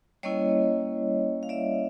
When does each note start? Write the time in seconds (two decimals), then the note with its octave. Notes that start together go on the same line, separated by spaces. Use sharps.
0.23 G3 A#3 C#4 E4 C#5 D#5
1.43 F5
1.49 D5 E5